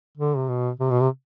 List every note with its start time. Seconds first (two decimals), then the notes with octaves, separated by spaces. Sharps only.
0.17 D3
0.37 C3
0.48 B2
0.80 C3
0.90 B2
1.00 C3